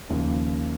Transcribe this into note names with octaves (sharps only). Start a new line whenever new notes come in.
D#2 C#3 F3